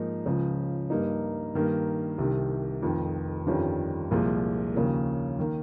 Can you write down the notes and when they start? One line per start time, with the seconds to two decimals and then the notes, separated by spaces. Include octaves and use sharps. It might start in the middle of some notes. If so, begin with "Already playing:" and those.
Already playing: G#2 F3 A#3 D#4
0.26 C#2 C#3 F3
0.90 G2 G3 A#3 D#4
1.55 G2 D#3 A#3
2.18 C2 C3 D#3
2.83 F1 F2 D#3
3.46 G1 F2 D#3 G3 C#4
4.11 C2 A#2 F3 G#3
4.74 D#2 C#3 F3 A#3
5.39 D#3 A#3